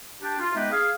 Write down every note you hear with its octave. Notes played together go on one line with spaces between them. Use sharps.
D4 G4
F4
G#3 B3 D#4 G4 B4 E5
G#4 F5